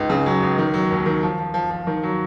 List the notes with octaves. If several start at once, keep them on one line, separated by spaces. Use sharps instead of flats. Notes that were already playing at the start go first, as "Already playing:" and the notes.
Already playing: C#2 D#4
C#3
F#3
C#2
D#3
F#3
D#2
D#3
F3
F3
F3
F3
D#3
F#3